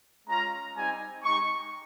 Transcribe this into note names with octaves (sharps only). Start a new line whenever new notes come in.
G#3 C#4 F4 A#5
G3 C4 D#4 G4 G#5
G#3 D#4 G4 C#6